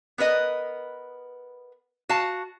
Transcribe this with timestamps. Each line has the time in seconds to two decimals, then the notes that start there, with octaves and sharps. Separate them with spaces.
0.18 B3 A#4 B4 D#5
2.09 F#4 F5 A5